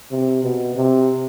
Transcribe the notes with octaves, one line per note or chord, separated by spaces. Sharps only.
C3
B2
C3